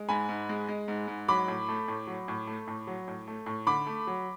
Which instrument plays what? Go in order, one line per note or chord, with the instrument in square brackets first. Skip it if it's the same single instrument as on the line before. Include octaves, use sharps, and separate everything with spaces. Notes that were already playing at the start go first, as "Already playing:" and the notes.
Already playing: [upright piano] G#3
G#2 G#5 B5
G#2
G#3
G#3
G#2
G#2
F#3 B5 D6
A2
A3
A2
F#3
A2
A3
A2
F#3
A2
A3
A2
D3 B5 D6
A3
F#3